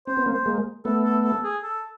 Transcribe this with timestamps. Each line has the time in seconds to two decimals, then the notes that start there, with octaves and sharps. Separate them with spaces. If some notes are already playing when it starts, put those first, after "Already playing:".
0.07 C4 C5
0.17 B3
0.26 A#3 C4
0.33 C5
0.46 G#3 A#3
0.85 A3 B3 A4
1.05 A4
1.24 A4
1.44 G#4
1.63 A4